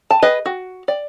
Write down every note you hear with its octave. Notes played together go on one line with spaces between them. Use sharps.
A5
G#4 B4 D#5
F#4
D5